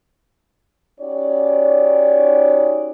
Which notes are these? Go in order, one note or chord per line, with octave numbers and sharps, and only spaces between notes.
C#4 D#4 F#4 G4 C#5 D5